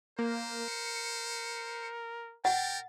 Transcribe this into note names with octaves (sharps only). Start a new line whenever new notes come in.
A#3 A#4 C5
C#7
A#4 F#5 G5 A6